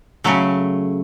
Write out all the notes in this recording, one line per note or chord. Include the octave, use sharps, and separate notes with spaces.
C#3 F#3 A3